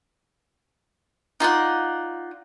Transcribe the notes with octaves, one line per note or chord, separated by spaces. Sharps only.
D#4 F4 D5 F#5